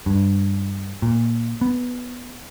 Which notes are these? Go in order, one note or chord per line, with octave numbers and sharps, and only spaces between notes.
G2
A#2
B3